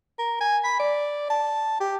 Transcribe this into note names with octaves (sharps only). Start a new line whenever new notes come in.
A#4
G#5
B5
D5
A5
G4